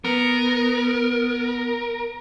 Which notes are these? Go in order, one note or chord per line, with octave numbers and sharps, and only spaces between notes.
B3 A#4